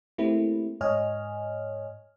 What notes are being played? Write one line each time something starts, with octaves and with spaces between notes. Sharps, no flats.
A3 A#3 C4 E4 G4
G#2 C#5 D#5 G#5 F6